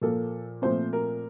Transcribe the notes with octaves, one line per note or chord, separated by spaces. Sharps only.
A#2 F3 A#3 A4
A#2 F3 A3 C4 C5
A#4